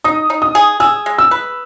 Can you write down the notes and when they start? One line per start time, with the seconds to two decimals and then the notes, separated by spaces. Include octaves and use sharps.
0.04 D#4 D#6
0.30 D#4
0.42 D#6
0.55 G#4
0.80 G#4 E6
1.06 G#3
1.18 E6
1.31 B4